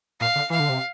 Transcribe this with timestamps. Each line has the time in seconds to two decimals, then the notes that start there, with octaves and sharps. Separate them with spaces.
0.20 A#2 F5
0.35 D3
0.50 E3 F5
0.60 D3
0.69 C3